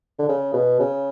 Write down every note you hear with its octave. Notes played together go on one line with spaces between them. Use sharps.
D3
C#3
B2
C#3